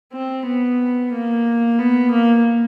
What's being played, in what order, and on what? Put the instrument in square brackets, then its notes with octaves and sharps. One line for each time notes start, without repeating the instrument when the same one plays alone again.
[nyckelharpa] C4
B3
A#3
B3
A#3